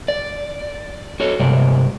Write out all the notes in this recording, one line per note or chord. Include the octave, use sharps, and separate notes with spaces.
D5
F#4 A4 C#5
G2 C3 G#3 D5